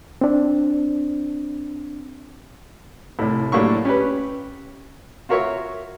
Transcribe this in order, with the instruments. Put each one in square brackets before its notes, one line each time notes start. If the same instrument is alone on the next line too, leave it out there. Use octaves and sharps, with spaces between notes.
[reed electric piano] C4 D4
[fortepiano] C2 A2
A2 F#3 G3 A#3 D4 C#6
C#4 G4 B4
F4 F#4 A#4 C#5 E5